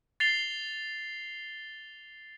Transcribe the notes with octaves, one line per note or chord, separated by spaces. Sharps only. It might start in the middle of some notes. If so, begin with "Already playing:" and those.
A6 C7 F7 G7